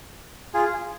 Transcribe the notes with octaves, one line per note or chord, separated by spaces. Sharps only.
F4 G#4